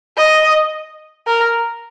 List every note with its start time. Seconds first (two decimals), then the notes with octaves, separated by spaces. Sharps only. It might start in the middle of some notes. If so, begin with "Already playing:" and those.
0.17 D#5
1.27 A#4